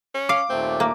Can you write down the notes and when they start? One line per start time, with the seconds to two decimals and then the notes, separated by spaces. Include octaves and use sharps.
0.15 C#4
0.29 F5 D6
0.50 D#2 A#2 A3 C4
0.80 A#3